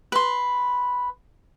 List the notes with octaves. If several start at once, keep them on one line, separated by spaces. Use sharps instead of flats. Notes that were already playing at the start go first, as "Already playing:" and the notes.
B4 C6